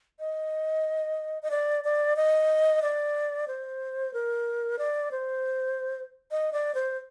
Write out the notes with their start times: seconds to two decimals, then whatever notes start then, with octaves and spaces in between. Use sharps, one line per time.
0.20 D#5
1.42 D#5
1.51 D5
1.84 D5
2.16 D#5
2.82 D5
3.48 C5
4.14 A#4
4.79 D5
5.11 C5
6.31 D#5
6.53 D5
6.75 C5